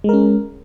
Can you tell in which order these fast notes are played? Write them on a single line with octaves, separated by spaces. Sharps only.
G#3 A#4 C#4